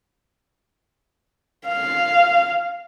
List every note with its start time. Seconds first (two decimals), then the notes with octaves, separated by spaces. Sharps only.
1.68 F5